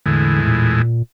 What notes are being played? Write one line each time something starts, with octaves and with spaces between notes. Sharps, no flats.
E2 A2 D3 G#3
A#2